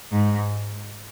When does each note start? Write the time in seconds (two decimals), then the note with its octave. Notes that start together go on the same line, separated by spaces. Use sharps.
0.12 G#2